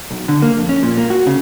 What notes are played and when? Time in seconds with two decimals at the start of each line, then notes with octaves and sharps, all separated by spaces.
0.11 B1
0.28 D3
0.42 A#3
0.57 F2
0.69 C#4
0.83 A#2
0.98 A#3
1.10 F#4
1.27 C#3